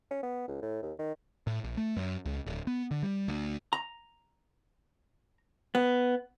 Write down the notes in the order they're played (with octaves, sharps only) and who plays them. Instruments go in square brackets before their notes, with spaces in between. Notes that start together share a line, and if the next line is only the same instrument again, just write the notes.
[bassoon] C#4
B3
C#2
A2
D#2
D#3
[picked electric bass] A2
A#1
A3
F#2
C#2
D1
B3
D3
G3
D2
[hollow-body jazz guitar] A#5
B3